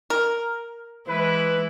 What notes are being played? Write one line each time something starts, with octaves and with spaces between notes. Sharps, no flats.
A#4
E3 G#3 E4 B4